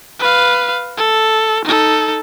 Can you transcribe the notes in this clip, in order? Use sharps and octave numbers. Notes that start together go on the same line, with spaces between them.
B4 F5
A4
D#4 A4